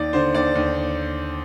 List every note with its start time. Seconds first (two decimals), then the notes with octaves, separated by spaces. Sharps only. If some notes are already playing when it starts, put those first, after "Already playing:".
Already playing: D#2 D5
0.13 D3 C5
0.34 D#2 D5
0.55 D#2